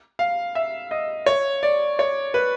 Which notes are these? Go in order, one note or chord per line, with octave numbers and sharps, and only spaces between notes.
F5
E5
D#5
C#5
D5
C#5
B4